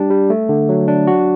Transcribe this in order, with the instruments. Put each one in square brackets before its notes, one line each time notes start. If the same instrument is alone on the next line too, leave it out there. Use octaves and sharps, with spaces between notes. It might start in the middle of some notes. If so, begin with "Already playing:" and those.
Already playing: [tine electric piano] G3 D4 G4
G3
A3
D3
F#3
D4
F#4